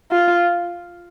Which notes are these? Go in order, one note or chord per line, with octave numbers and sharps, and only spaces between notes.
F4